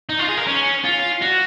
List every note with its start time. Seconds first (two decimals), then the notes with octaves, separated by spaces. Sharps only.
0.09 D#4
0.19 F4
0.29 G#4
0.38 A#4
0.47 C#4
0.85 F4
1.22 F#4